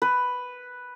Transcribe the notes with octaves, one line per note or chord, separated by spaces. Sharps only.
B4